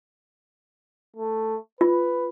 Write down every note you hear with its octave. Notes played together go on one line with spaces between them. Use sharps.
A3
F4 B4